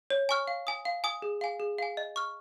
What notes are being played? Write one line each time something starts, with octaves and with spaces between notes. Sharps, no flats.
C#5
G#5 C#6 F6
F5
G#5 D#6
F5
G#5 D#6
G#4
F5 G#5
G#4
F5 G#5
D#5
C#6 F6